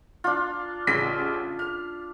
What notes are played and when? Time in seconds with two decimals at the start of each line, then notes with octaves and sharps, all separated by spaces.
0.24 D4 F4
0.87 A1 C#3 B6
1.59 F6